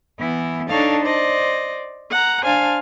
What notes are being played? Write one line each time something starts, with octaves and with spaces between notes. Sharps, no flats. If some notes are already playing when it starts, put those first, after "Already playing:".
E3 B3 E4
D4 D#4 A4 C#5 F5 A5
C5 D5 D#5
F#5 A#5
D4 C5 F5 G#5 A5 F6